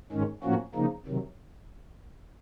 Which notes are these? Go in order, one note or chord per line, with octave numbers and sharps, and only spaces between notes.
G#2 D#3 G#3 C#4
A2 F3 A#3 C#4 F#4
C#3 F3 A#3 D#4
C3 D#3 F#3